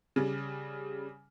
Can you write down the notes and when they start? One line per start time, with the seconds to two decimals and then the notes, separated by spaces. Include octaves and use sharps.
0.16 C#3 G3